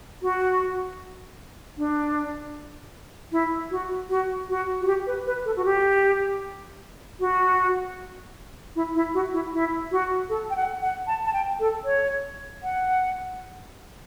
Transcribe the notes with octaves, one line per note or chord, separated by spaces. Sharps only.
F#4
D4
E4
F#4
F#4
F#4
F#4
G4
B4
B4
A4
F#4
G4
F#4
E4
E4
F#4
E4
E4
F#4
A4
G5
F#5
F#5
A5
A5
G5
A4
C#5
F#5